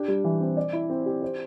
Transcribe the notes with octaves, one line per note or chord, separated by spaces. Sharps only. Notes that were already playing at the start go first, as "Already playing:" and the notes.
Already playing: D4 G4
G3
E3
C4
D5
E4
C4
G4
C5